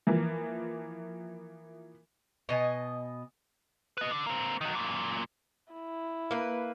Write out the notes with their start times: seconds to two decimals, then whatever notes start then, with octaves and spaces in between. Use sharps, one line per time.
0.07 E3 F3 A#3
2.49 B2 D#5 G#5
3.98 B4 D#5
4.11 D3
4.27 A#3 C4
4.61 D#3 F#3
4.75 F#2 A#2
5.72 E4
6.31 A#3 B4